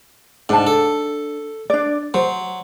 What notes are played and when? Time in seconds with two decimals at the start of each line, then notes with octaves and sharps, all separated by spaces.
0.49 G#2 D4 A5
0.67 A4
1.70 D4 D5
2.14 F#3 C5